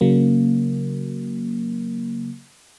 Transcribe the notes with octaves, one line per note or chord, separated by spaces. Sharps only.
C#3 F#3 A#3